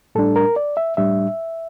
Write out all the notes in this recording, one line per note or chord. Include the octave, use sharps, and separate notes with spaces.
A2 G3 D4 A4
A#4
D5
E5
A2 G3 D4 E5